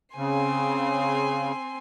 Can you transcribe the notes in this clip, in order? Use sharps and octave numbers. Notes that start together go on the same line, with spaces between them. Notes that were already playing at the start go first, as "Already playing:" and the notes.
C#3 C4 G#5 C6